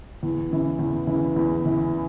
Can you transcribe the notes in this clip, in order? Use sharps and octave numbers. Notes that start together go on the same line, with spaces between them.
E2
C#3 E3
E2
C#3 E3
E2
C#3 E3